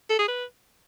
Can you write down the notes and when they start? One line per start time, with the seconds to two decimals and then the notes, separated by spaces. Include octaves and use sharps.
0.10 A4
0.19 G#4
0.28 B4